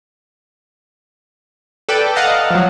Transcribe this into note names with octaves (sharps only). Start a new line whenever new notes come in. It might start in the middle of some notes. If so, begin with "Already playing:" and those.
A4 B4 D5 G5
D#5 F5 F#5 A5 A#5 D#6
F3 F#3